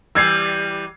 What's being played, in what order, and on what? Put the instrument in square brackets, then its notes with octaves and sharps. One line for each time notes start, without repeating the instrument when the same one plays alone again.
[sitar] E3 G3 [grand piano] E6 G#6 C7